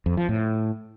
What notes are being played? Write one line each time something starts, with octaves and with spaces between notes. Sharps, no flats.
F2
F3
A2